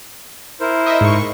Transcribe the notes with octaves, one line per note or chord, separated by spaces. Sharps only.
E4 A#4 C5
D#5 E5
G#2 C#6